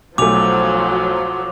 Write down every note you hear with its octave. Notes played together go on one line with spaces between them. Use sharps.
B1 F3 F#3 A3 D6 F7